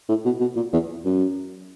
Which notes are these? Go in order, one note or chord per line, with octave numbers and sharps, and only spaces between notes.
A2
B2
B2
A#2
E2
F#2